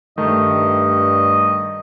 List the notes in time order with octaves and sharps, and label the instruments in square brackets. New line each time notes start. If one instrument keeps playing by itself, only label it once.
[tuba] G2 [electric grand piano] D#3 A3 [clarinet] D#5